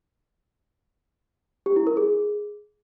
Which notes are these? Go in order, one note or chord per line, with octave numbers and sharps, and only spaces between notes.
G4
E4
A#4
G#4